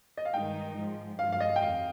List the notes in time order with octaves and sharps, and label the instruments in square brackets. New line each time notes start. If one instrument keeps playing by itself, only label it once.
[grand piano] D#5
F5
[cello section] G2 D#3 G#3 D#4 [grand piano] G5
[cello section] G#2 F3 G#3
[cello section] G2 F3 G#3 [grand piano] F5
[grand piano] F5
D#5
G5
[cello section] F2 [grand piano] F5